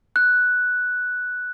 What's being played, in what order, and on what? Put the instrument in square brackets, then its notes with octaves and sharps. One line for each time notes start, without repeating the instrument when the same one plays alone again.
[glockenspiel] F#6